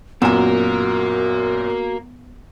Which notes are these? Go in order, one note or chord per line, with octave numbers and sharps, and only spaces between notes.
F#2 A#2 A#3 B3 F#4 A#4 G#5 E7